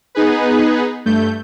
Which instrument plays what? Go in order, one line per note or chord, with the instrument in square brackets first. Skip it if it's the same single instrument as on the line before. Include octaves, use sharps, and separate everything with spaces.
[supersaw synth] B3 D#4 G#4 B4
G2 A3 G6